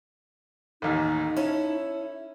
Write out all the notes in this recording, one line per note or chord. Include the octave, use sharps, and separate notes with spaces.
A1 D#2 D#4
C#4 E4 A4